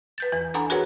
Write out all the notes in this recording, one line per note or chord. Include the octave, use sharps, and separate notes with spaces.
B4 G6 A6
E2 E3
D4 A4 F#5 G#5 A#5 B5
F#4 G#4 A#4 B4 C#5 F#5